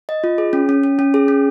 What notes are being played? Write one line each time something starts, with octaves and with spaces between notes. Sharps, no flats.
D#5
F4
G#4
C#4
C#4
C#4
C#4
G#4
C#4